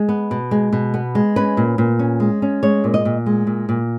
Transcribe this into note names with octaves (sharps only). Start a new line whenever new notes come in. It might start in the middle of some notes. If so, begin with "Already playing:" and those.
Already playing: G#3
B3
B2
G#3
B2
B3
G#3
C#4 B4
A#2
A#2
C#4
G#3
C#4
G#3 C#5
A#2
D#5
A#2
G#3
A#2
A#2